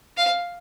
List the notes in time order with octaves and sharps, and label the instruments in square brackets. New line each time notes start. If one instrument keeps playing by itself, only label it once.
[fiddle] F5